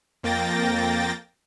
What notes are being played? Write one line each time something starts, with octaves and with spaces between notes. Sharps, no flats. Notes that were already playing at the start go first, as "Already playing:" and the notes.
F2 A#3 G5 A6 A#6